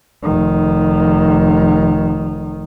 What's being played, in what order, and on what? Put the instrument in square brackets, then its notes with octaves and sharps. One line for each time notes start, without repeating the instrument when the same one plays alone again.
[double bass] F1 D#3